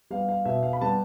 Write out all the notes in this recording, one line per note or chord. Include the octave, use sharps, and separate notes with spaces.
G3 B3 F5
F5
B2 E5
F5
B5
G3 B3 A5